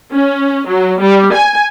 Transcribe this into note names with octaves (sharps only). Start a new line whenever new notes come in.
C#4
F#3
G3
G#5